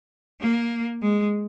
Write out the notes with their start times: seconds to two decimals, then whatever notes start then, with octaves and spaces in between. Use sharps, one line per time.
0.39 A#3
1.01 G#3